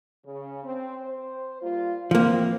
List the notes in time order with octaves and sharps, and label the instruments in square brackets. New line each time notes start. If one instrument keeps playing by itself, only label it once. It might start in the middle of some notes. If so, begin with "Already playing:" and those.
[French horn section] C#3
C4
C5
G3 A#3 F4
[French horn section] E3 C4 [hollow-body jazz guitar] F3 A#3